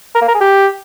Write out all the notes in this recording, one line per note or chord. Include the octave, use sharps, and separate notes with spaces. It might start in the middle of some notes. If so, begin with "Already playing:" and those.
A#4
A#3
A#4
G#4
G4